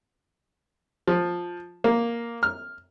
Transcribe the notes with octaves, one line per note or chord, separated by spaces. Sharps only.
F3
A#3
F6